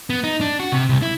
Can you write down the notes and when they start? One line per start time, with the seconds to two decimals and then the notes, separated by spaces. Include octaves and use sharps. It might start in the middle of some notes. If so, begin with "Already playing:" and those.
0.10 B3
0.24 D#4
0.41 D4
0.60 F#4
0.72 C3
0.89 C2
1.02 E4